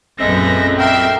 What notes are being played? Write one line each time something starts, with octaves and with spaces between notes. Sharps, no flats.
A#1 F#2 G#3 C4 A4 B4 E5 A#6
A#4 E5 F5 G5